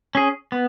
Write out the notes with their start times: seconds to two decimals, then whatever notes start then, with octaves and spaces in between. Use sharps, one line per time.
0.15 C#4 G#4
0.52 B3